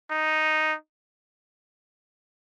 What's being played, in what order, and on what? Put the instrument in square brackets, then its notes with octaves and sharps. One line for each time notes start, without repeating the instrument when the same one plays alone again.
[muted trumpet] D#4